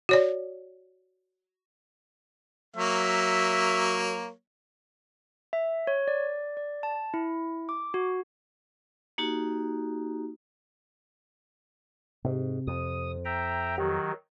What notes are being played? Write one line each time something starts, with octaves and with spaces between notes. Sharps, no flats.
F#4 C#5 D5
F#3 A#3 C#5 E5
E5
C#5
D5
D5
A5
E4
D6
F#4
A#3 D#4 F#4 G4
G#2 C3
F2 D#6
E5 G5 A#5
D#3 F#3 G4